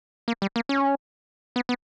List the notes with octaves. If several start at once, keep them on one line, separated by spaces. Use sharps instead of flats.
A#3
G3
A#3
C#4
B3
B3